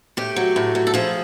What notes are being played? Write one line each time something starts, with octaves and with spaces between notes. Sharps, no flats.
A2 G4
F#3
A2
F#3
A4
F3 G#4